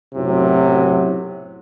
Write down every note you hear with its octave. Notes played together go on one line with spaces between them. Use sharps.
B1 F#2 A2 C3 F#3 E4